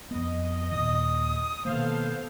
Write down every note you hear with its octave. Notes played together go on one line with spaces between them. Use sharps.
F2 B3 D#5
D#2 A#2 D#3 D#6
B2 D#3 A#3 B3 A4 C5 F5